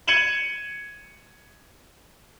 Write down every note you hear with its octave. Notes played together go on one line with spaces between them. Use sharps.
G#6 C#7 D#7 E7 F#7 G7